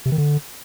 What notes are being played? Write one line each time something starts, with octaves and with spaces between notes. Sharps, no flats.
C3
D#3
D3